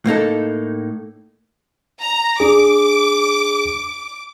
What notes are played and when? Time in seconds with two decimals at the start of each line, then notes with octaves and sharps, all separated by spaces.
0.06 A2 A#3 D#4 A4
2.01 A#5
2.40 D4 G#4 D6